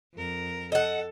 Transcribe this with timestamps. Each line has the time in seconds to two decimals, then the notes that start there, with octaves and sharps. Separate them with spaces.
0.14 F2 A#4
0.72 A4 D#5 F#5